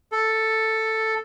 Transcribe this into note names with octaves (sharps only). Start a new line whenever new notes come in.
A4